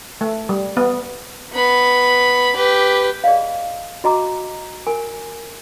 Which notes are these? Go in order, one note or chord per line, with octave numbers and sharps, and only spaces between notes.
A3
G3
B3
B3 B5
G4 B4
G#4 D5 D#5 F5
F#4 D#5 A#5 D6
A#4 G#5